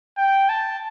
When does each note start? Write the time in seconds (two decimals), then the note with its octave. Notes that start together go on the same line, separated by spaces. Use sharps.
0.18 G5
0.49 A5